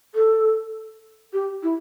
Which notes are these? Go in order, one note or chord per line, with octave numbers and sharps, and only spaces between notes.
A4
G4
E4